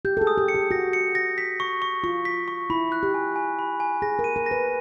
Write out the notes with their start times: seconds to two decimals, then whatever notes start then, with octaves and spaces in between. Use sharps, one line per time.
0.05 G4 G6
0.17 A4
0.21 G#4
0.27 D#6
0.38 G4
0.48 C#7
0.55 G4
0.71 F#4 A#6
0.93 C#7
1.15 A#6
1.38 B6
1.60 C#6
1.82 C#6
2.04 F4 C#6
2.25 B6
2.48 C#6
2.70 E4 B5
2.92 F#6
3.03 G4
3.14 G#5
3.36 G#5
3.59 B5
3.80 G#5
4.02 G#4 A#6
4.19 A#4
4.24 D#7
4.36 A#4
4.46 A#6
4.51 B4